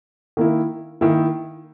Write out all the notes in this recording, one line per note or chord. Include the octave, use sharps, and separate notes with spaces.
D#3 A#3 E4
D#3 A#3 E4